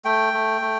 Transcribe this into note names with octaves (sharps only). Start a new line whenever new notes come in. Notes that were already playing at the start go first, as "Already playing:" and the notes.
A3 G5
A3
A3